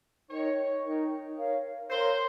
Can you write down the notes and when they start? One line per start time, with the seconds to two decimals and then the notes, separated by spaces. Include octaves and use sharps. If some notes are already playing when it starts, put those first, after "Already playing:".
0.30 D#4 A#4 C#5 D#5 G5
0.84 D#4 A#4 D#5 G5
1.37 A#4 C#5 F5
1.90 A#4 C5 C#5 F5